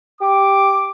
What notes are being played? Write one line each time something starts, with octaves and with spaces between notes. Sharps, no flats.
G4 D6